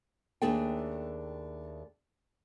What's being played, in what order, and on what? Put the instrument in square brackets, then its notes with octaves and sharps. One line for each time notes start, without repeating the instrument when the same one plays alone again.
[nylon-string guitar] D#2 A3 D4 G#4 A4 G5